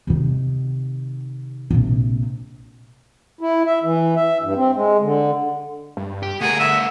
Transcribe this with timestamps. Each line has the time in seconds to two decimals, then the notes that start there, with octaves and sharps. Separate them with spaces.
0.07 C3 D#3
1.71 A#1 C3
3.41 E4
3.66 E5
3.84 E3
4.16 E5
4.42 G2
4.55 C4
4.74 G#3
5.00 D3
5.97 G2
6.23 G4
6.41 D3 A3 G#4 A#4 F#5
6.59 E5 F#5